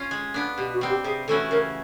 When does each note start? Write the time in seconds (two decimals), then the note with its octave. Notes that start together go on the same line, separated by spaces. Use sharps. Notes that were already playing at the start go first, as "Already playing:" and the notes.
Already playing: C#4 F4
0.11 G#3
0.34 B3 D4
0.58 B2 G4
0.73 F#4
0.81 G3 C4
0.89 G4
1.04 C3 G#4
1.27 E3 A3 C#4 F#4 A4
1.51 C#3 A#4